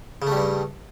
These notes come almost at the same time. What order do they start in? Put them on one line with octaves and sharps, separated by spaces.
C#3 A3 G3 G2